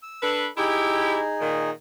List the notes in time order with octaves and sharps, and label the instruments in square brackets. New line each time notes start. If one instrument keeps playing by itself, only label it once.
[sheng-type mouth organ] E6
[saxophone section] D4 A4 B4
[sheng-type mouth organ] D#4 G#4 [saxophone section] E4 G4
[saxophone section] A#2 D#3